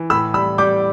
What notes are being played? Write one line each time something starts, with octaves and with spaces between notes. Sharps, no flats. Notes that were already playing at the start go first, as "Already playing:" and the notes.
Already playing: E3
A2 B5 E6
G3 B5 E6
G3 D6 G6